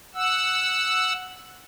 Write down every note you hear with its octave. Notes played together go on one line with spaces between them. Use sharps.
F#5 E6